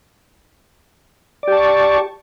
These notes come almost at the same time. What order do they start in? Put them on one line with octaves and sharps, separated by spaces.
D5 G4 A5 C#6